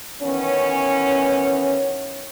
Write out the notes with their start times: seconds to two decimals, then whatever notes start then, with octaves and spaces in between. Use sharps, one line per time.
0.22 D#3 E3 B3 C#4